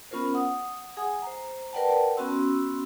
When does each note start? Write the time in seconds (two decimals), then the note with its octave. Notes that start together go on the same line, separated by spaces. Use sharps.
0.11 B3 C#4 F4 A#4 C5
0.34 F#5 D#6
0.97 G#4 F#5 G#5 D#6
1.22 C5 A#5
1.73 A#4 B4 D5 F#5 G5 A5
2.17 B3 C#4 F#4 C6 E6